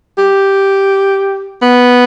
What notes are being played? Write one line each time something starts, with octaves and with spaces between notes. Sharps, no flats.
G4
B3